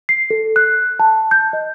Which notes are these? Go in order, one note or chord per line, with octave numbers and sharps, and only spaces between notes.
C7
A4
F#6
A5
G6
D#5